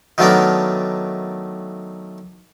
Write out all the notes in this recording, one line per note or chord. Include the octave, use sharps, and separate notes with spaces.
D#3 F#3 A3 B3 D4 A#4